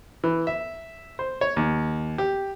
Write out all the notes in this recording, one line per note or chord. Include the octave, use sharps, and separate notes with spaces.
E3
E5
C5
C#5
D#2
G4